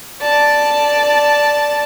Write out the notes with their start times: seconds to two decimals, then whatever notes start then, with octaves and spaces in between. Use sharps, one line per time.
0.21 D5 A5